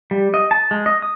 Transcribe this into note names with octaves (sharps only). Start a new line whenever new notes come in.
G3
D#5
A5
G#3
D#5
D#6